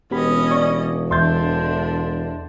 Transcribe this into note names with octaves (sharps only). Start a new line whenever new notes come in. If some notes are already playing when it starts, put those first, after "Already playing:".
E1 B3 C#4 G4 D#5 B5
D5 C#6
E2 D3 D4 E5 C6 G6 A6